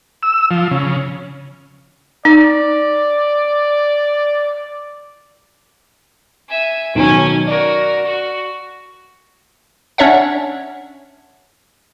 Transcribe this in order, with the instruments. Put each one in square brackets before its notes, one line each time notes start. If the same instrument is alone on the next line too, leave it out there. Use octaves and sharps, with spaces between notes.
[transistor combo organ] E6
F3
C#3
[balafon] D#4 [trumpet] D5
[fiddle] E5 G#5
[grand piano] B1 D#3 F#3 [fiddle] C#4 G#5
[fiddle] F#4 A#4 [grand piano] D5
[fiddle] F#4
[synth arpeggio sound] C#4 D4 C#5 E5 F#5